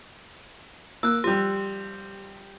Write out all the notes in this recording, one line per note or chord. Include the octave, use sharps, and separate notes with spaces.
A#3 E6 F#6
F3 G3 G4